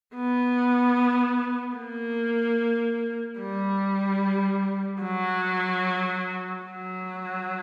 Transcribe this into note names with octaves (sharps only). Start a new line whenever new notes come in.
B3
A#3
G3
F#3
F#3